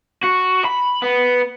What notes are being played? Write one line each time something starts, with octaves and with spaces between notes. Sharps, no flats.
F#4
B5
B3